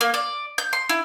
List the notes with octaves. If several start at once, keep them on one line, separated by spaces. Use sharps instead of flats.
A#3
D5
G6
C6
E4